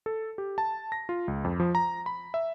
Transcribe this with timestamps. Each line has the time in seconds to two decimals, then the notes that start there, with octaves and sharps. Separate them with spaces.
0.06 A4
0.38 G4
0.58 A5
0.92 A#6
1.09 F4
1.28 C#2
1.44 F2
1.60 F3
1.75 A#5
2.06 B5
2.34 E5